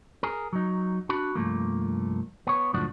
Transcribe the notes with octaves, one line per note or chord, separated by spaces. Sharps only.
G#4 A#4
F#3 D#4
D4 F#4 B5
C2 G2 F3 A3 A#3
B3 C#5
C#2 F#2 A2 F3 D4 F#4